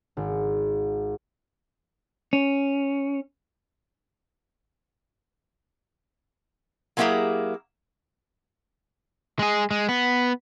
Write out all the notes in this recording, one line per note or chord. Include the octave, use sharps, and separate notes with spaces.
G#1
C#4
F#3 G#3 A#3 E4 G4 G#4
G#3 G#4
G#3
B3